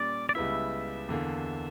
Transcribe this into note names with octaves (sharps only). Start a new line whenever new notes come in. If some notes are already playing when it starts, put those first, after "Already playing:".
Already playing: A#2 G3 C#4 D5
D5
C#2 C#3 G3 B3 E4 E5
E2 D3 A#3